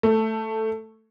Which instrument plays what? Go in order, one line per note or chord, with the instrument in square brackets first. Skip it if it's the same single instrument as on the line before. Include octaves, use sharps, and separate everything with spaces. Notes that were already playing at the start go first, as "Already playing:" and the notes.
[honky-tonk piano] A3